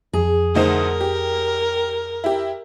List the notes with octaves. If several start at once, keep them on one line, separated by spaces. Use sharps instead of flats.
F2 G#4
D2 D#4 A#4 C5
G4
E4 G4